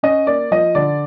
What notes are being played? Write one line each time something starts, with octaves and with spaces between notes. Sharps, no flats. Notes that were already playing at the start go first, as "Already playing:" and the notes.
C#4 D#5
A#3 D5
F3 D#5
D3 D5